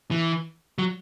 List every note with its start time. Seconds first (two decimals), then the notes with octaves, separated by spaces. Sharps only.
0.11 E3
0.78 F#3